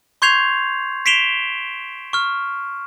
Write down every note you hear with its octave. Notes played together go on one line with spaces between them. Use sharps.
C6 C#6 G6 G#6 C7 F7
B6 C7 D7 E7 F7 G7
C#6 F6